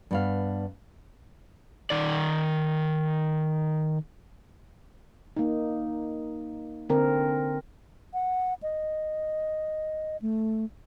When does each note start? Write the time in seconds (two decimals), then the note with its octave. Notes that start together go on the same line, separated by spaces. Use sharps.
0.11 G2 B3 F5
1.90 D#3 D5
5.37 A#3 D#4
6.89 D3 C4 A#4
8.14 F#5
8.63 D#5
10.22 A3